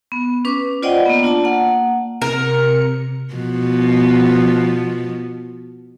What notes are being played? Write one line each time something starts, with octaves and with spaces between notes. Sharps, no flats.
B3
C#4 B4 D6
F4 C5 D5 D#5 F#5 G5
A#3 B3
D4 F4 D5 A5
A#3 F#5
C3 A#4 C#7
B2 F3 B3